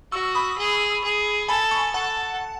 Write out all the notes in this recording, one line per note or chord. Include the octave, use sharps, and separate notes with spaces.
F#4 C#6 E6
E6
B5 D#6
G#4
G#4
A4 G#5 B5
A5 C#6
A4 F#5 A5